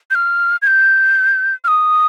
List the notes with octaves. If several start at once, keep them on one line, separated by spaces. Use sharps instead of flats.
G6
F6
G#6
G6
F6
D#6